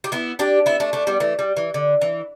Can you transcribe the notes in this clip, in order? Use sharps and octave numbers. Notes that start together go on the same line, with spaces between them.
G4
B3 E4
D4 G4
B3 E4
A3 D4
A3 D4
G3 B3
E3 A3
G3
E3
D3
E3